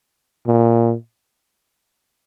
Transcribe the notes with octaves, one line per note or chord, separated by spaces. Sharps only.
A#2